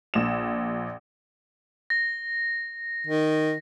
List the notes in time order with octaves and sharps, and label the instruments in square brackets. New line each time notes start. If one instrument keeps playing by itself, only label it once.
[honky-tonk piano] A#1 E7
[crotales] A#6
[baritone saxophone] D#3